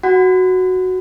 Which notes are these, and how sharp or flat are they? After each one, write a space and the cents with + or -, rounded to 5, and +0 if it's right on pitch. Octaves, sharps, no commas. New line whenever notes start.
F#4 +0 F#5 +0